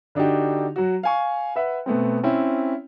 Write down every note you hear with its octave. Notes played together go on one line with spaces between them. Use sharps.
D3 D4 D#4 F#4 G4
F#3 F#4
F5 G#5 C#6
B4 E5 F#5
B2 A3 B3 C4
C4 C#4 E4